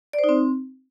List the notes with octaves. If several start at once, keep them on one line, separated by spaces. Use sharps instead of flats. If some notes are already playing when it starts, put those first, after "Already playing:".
D5
C5
D#4
C4